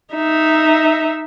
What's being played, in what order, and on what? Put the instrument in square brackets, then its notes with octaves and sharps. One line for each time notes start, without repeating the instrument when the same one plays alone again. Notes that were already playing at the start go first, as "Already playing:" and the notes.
[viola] D#4 E5